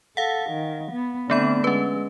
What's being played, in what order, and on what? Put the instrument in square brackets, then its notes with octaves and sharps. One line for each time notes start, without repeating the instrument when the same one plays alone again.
[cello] A4 [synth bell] F5 F#5
[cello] D#3
B3
[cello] D3 C4 [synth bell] A3 B3 B5
[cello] G#3 [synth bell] C#4 B4